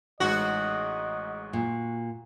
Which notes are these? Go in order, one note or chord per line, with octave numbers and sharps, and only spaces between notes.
A1 G#2 G#3 F#4 D#5
A#2